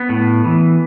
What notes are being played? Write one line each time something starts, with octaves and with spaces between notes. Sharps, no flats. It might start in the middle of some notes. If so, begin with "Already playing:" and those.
Already playing: B3
A2
E3